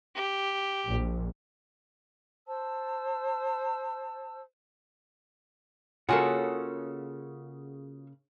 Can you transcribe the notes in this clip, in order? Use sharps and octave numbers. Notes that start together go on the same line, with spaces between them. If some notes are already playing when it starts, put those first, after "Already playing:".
G4
A#1
C5 A5 E6
C#3 A#3 F4 F#4 A4 F#5 G#5